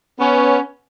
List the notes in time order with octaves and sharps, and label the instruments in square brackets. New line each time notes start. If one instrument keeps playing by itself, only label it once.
[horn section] B3 C#4